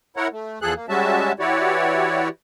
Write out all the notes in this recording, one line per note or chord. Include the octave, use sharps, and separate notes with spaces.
E4 A#4 C#5 F#5
A3
E2 F3 G#4 A4 F#6
A#3
G3 G#3 C#4 F#4 E5 A5
E3 E4 F#4 G4 C#5 D5